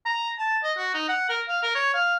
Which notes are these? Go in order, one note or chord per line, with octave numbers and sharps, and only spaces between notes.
A#5
A5
D#5
F#4
D#4
F#5
A#4
F5
A#4
C#5
F5